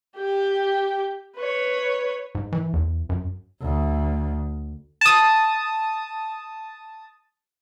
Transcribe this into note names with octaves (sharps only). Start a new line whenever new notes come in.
G4 G5
B4 C#5
G#2
E3
E2
F#2
D2
A5 D#6